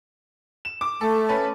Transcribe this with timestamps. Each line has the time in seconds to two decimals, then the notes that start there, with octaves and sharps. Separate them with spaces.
0.65 E7
0.81 D6
1.01 A3 A4
1.29 C#4 A4 B4